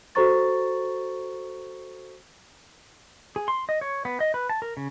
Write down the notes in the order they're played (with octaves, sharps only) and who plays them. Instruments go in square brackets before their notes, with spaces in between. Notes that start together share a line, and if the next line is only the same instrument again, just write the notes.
[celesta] F#4 A4 C5 A#5 C#6 A6
[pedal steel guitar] G#4
C6
D#5
C#5
B3
D#5
B4
A5
A#4
C#3